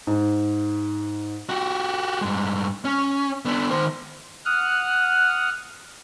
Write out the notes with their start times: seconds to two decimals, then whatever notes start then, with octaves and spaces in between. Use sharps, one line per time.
0.07 G#2
1.49 F#4 G4
2.21 G2 G#3
2.85 C#4
3.45 B3 D4
3.71 D#3 C5
4.45 F#5 D#6 F6 F#6